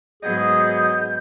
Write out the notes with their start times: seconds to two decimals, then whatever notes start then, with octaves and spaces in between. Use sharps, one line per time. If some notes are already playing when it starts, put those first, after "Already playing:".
0.23 G#2 F#3 B3 G#4 D#5 G6